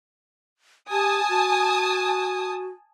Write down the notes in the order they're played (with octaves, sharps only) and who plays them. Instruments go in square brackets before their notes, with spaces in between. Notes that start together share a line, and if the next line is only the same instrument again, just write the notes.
[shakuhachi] G4 [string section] G#5 A5 D#6
[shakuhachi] F#4